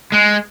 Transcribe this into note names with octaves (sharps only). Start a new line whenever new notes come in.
G#3